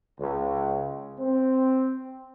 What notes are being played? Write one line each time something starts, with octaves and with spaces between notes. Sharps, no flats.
C#2
C4